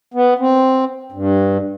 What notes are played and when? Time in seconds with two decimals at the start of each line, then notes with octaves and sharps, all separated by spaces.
0.14 B3
0.39 C4
1.12 G2